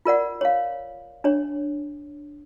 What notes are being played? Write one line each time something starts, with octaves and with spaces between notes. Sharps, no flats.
F4 A#4 D5 F#5
C#5 F5
D4 C#5